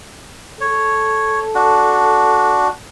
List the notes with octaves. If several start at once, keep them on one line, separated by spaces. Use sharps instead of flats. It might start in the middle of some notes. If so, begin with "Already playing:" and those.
A4 C#5
D4 F#4